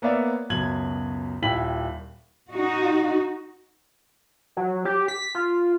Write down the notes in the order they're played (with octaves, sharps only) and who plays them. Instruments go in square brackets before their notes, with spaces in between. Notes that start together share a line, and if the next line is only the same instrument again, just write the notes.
[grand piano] A#3 B3 C#5 D5 E5 F5
C#2 F#2 B2 G#6 F#7
D#1 E4 G5 B5 B6 F#7
[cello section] D#4 F#4
[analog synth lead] F#3
G4
B6
F4